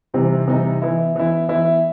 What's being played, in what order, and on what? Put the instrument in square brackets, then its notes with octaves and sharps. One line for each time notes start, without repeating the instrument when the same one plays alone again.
[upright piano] C3 E3 G3 C4 D#4
C3 E3 G3 C4 D#4
E3 B3 E4
E3 B3 E4
E3 B3 E4